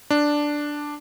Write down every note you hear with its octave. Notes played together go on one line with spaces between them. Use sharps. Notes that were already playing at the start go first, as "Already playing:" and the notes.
D4